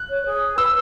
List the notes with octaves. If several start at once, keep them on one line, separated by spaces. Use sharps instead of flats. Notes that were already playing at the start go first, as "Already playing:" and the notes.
Already playing: F#6
C#5
G#4
B4 E6